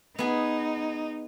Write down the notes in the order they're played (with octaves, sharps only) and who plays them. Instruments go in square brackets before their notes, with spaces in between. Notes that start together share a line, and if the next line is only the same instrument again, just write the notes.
[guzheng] B3 G#4 [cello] D#4